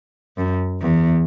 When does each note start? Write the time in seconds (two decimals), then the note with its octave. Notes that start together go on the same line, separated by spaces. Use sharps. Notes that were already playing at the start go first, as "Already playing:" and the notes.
0.37 F#2
0.81 E2